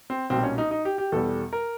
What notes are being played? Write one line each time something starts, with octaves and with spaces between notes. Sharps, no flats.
C4
B1 A#2 G3 C4
C#4
D#4
D#4
G4
G4
E2 B2 G3 A4
A#4